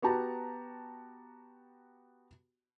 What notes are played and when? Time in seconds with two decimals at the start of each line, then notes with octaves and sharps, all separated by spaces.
0.02 B3 F#4 G4 A5 A#5